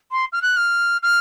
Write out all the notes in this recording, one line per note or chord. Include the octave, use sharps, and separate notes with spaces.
C6
F6
F#6
F6
F6